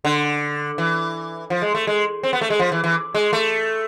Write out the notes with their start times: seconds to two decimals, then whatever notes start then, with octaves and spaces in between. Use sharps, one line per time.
0.05 D3
0.78 E3
1.50 F3
1.62 G#3
1.75 A3
1.87 G#3
2.23 C4
2.33 B3
2.41 A3
2.50 G#3
2.59 F3
2.72 E3
2.84 E3
3.15 G#3
3.33 A3